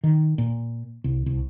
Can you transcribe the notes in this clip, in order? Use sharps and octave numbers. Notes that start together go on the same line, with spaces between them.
D#3
A#2
C2
C2